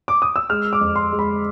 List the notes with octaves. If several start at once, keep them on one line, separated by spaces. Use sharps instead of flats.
D6
D#6
E6
G#3 F6
D6
F2
C6
G#3
B5